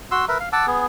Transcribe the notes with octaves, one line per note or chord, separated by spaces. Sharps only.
F#4 C6 E6
A#4 B4 E5
F5
F#5 A5 D6 E6
B3 G#4